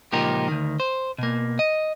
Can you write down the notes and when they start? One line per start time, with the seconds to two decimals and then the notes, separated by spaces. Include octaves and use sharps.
0.12 C#2 A#2 F3 D#4 G4 A#4
0.48 D2 D#3
0.80 C5
1.18 B2 A#3
1.59 D#5